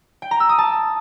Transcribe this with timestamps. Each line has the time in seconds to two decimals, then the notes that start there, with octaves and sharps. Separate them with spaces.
0.22 G5
0.31 A#5
0.40 E6
0.49 D#6
0.58 A5